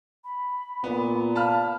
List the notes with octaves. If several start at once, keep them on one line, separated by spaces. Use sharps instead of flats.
B5
A#2 B3
F5 A5 B5 F6